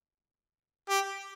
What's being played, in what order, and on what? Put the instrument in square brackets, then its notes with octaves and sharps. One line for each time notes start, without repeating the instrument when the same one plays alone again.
[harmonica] G4